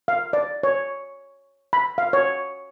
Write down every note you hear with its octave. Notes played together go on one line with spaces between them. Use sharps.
F5
D5
C#5
B5
F5
C#5